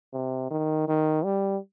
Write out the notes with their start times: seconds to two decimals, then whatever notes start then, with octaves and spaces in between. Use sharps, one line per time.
0.13 C3
0.51 D#3
0.88 D#3
1.24 G3